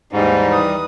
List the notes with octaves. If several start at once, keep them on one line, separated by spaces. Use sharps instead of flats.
D#2 G#2 E3 G3 D#4
B4 D#6